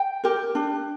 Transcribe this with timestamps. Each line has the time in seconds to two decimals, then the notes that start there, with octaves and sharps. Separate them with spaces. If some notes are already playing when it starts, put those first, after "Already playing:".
Already playing: G5
0.24 G4 A#4
0.55 D4